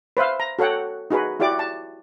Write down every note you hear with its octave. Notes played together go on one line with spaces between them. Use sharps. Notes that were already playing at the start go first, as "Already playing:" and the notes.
B4 C5 E5 F5
A#5
F#4 A4 C#5 F#5 G5
D#4 F#4 G#4 B4
E4 F#4 G4 D5 D6
A5